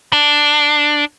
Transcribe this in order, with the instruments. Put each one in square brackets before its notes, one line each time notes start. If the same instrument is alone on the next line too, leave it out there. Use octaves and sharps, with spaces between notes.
[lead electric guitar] D4